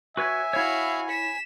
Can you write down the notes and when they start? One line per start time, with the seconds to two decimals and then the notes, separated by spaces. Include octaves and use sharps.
0.17 F#4 B4 C#5 E5 G#5
0.53 E4 F#4 C#5 F5
1.09 B6 E7